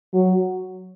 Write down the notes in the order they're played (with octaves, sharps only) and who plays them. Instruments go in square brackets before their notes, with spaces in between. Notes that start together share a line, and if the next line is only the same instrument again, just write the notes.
[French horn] F#3